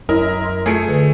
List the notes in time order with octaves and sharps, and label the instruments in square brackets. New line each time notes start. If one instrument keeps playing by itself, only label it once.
[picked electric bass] F#2 [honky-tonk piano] E4 D#5 [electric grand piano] A#4
[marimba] C6
[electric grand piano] A3 [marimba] F4 [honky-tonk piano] G#4 C7 C#7
[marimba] D3 B4